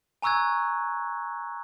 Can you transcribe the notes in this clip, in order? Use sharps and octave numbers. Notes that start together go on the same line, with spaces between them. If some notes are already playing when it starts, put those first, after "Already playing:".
G#5 A#5 C#6 E6 F#6 G#6